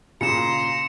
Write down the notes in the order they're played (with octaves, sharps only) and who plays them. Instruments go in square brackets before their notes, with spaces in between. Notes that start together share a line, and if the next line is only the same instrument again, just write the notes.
[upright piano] A#2 C#3 [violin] A#5 C6 [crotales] C#7 E7